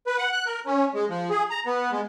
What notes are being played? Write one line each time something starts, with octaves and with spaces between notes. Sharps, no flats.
B4
F#5
F#6
A#4
C#4
G#3
F3
G#4
A#5
B3
G#3